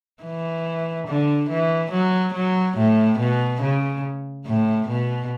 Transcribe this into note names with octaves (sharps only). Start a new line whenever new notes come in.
E3
D3
E3
F#3
F#3
A2
B2
C#3
A2
B2